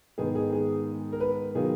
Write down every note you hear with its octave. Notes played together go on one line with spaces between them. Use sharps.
G#2 D#3 G#3 B3 G#4
G#4
G#4
A#4
B4
D#3 F#3 B3 F4 G#4